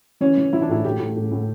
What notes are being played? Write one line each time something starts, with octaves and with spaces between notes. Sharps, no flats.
E3 C#4
E3
E3 E4
D4
A2 E4
A2 G4
A2
A2
A2